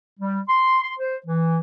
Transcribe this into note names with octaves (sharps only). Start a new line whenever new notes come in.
G3
C6
C6
C5
E3